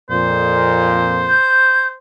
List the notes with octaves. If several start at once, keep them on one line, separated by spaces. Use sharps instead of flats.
F2 A#2 C5
G6